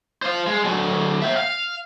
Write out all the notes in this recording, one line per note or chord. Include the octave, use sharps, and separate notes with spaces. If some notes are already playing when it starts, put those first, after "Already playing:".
C5 F5
G#3
F#3 A3
E5 G5
F5